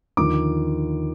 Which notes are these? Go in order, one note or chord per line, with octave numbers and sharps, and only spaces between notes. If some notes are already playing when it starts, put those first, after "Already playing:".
D#2 D3 F3 D6